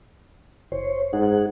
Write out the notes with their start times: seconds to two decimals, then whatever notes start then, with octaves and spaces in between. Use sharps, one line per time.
0.72 F#1 C5 C#5
1.13 G#2 D#4 G#4 F#5